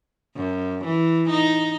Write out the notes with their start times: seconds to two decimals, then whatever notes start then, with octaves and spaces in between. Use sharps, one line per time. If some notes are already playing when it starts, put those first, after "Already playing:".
0.36 F#2
0.85 E3
1.30 D#4